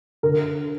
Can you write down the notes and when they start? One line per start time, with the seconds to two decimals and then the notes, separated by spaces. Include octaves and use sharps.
0.23 D3 A#4